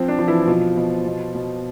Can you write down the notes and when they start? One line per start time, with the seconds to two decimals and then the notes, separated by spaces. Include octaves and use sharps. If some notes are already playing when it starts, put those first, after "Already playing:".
Already playing: F3 C4
0.08 D4
0.19 F3
0.28 E3 E4
0.47 B2 F3 F4
0.76 B2
1.06 B2
1.35 B2